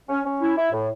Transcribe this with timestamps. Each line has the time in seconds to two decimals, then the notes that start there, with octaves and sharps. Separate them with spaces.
0.09 C#4
0.25 C#4
0.41 E4
0.57 E4
0.72 A2